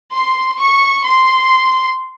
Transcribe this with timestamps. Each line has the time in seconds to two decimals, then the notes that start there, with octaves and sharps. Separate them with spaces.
0.13 C6
0.59 C#6
1.05 C6